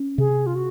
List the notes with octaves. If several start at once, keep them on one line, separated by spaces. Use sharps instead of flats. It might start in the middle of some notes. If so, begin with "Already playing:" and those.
Already playing: C#4
C3 G#4
F4
F#4